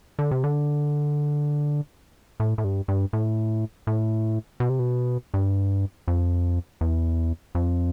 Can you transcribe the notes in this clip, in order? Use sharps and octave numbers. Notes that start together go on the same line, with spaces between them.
D3
C3
D3
A2
A2
G2
G2
A2
A2
B2
C3
B2
G2
F2
E2
F2